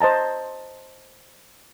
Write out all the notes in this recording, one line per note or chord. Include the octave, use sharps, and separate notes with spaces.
C5 D#5 A5 A#5